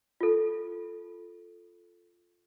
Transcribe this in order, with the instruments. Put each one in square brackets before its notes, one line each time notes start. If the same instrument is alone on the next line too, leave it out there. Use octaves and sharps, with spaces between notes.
[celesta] F4 A4